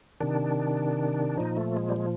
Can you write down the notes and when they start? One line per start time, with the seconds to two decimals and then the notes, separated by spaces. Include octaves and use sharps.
0.20 C3 D#3 D4
1.37 A#2 F3 D#4
1.57 A3
1.77 G#3
1.89 G3
1.96 G#3